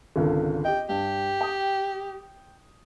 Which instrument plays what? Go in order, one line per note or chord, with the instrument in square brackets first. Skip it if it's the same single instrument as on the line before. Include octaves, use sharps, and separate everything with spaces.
[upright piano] G#1 C#2 D3
[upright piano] G4 D#5 [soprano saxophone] G5
[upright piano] G2 [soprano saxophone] G4
[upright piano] G5 D#6